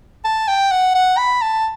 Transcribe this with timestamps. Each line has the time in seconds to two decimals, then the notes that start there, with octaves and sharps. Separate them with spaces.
0.25 A5
0.48 G5
0.72 F#5
0.95 F#5
1.17 B5
1.42 A5